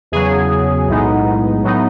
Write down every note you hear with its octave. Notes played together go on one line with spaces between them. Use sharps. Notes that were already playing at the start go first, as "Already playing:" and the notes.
E2 C#3 F#3 G#4
B1 A2 G#3 B3 D#4
A2 F#3 B3 D#4